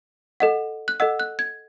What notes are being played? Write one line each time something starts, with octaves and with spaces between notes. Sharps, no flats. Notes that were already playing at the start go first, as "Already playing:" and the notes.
A4 D#5 F#5
F#6
A4 D#5 F#5 E6
F#6
G#6